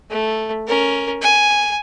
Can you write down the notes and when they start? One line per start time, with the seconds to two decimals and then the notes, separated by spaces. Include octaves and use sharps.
0.10 A3
0.67 C#4 A#4
1.22 G#5